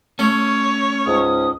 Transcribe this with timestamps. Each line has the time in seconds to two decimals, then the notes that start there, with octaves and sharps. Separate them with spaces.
0.19 A3 C#4 C#5
1.07 C#2 G#2 D#6